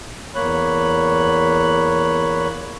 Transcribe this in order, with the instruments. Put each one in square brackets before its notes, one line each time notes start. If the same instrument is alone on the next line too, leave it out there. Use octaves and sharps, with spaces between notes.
[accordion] E2 A#3 C#5 B5 F#6